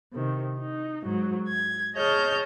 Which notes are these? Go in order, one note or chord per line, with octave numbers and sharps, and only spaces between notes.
C3 D#3
D#4
G#2 F#3
G#6
G#4 C#5 D#5 A5 F6 G6